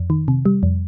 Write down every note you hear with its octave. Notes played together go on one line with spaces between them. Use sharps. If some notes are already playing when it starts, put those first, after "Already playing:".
Already playing: F2
D#3
C3
G3
F2